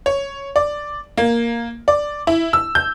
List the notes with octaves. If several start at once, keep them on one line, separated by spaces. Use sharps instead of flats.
C#5
D5
A#3
D5
E4
E6
G6